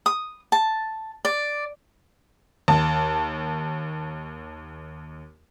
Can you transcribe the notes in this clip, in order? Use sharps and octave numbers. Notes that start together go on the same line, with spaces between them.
D#6
A5
D5
D#2 A5